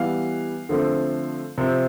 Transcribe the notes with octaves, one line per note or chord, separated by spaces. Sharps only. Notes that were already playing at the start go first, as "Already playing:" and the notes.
Already playing: E3 G3 B3 F5
D3 F3 A3 C4
C3 F3 C4